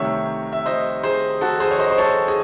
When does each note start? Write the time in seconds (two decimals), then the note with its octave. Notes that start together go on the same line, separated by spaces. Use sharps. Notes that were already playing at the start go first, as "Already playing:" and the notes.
Already playing: C2 C3 D#3 A3 C#5 E5
0.53 E5
0.66 C5 D#5
1.03 G#4 C5
1.41 F#4 A4
1.60 G#4 C5
1.71 C#5
1.79 C5 D#5
1.91 C5
1.98 A4 C#5
2.28 G#4